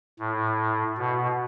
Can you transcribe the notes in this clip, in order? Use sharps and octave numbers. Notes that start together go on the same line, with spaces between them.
A2
B2